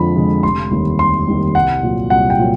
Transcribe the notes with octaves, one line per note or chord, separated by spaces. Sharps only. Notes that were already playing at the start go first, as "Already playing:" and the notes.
Already playing: F2 D3 F3 G#3 B5
D3 F3 G#3
F1 C6
D#2 D#3 G3
F1 C6
D#2 D#3 G3
C2 F#5
A#2 F#3
C2 F#5
G5
A#2 F#3